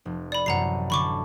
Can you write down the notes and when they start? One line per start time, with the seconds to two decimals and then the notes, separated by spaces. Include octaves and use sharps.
0.05 F1
0.32 D5 B5
0.46 A1 F#2 C3 F#5 A#5 C7
0.90 D3 A4 B5 C#6 D6